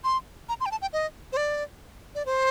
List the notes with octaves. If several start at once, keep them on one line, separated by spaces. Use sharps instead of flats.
C6
A#5
C6
G5
A5
G5
D#5
C5
D5
D5
C5